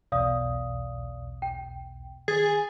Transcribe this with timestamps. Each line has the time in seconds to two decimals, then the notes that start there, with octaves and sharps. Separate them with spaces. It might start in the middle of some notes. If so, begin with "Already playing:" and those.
0.12 B1 E2 B2 D5 F5 D#6
1.42 G5
2.28 D#3 G#4 A6